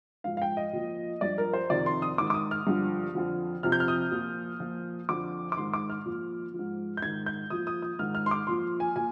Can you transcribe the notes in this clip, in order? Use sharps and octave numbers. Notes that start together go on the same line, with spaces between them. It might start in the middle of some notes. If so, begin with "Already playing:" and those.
G#2 F3 F5
F5
G5
D#5
A#2 F3
G2 F3 D5
A#4
C5
F2 C3 D#3 D5
C6
D#6
G#2 D#3 D6
D6
D#6
F6
G2 D3 F3
F2 D3 F3
F2 C3 F3 F6
G6
F6
D#6
A#2 F3
A#2 F3
F2 D3 F3 D6
D6
G#2 D#3 C6
D6
F6
A#2 F3
F3
G#2
G6
G#2 D#3 G#6
G6
A#2 F3 D#6
D#6
D#6
G#2 D#3 F6
F6
C6
D6
A#2 F3 C6
G#5
A#2 G#5